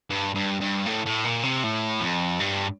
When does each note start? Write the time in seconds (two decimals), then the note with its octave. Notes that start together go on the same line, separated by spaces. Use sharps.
0.10 G2
0.35 G2
0.61 G2
0.86 A2
1.06 A2
1.25 A#2
1.43 C3
1.64 A2
2.01 F2
2.40 G2